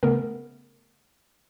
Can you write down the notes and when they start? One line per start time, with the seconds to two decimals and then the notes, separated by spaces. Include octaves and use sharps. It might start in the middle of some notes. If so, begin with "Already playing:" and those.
0.03 C#3 A3 B3 A#4